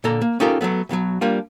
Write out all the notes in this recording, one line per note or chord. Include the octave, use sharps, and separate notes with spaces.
A#2 D3 A#3 A4 A#5
A#3
C#4 D#4 F4 G4 A4 A#4
F#3 G#3 A3 B3
B1 B2 E3 F#3
G3 A#3 D4 F4